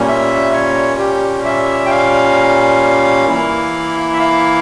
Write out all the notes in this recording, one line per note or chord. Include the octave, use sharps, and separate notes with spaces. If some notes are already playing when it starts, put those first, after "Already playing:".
Already playing: A#2 G3 A#3 C#4
E5
C#5
G4
E5
G5
F5
E3 A#3 E4
E5
F5